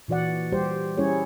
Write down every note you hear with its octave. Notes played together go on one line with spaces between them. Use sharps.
A#2 E3 F#4 D5 F#5
G3 G4 C5
G3 C#4 E4 G#4 C#5